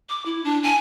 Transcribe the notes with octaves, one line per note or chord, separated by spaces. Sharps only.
D6
E4
D4
G#5